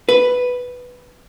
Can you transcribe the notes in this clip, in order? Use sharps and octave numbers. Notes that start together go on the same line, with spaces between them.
B4